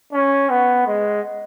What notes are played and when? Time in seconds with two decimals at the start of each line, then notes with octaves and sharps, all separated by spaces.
0.13 C#4
0.50 B3
0.87 G#3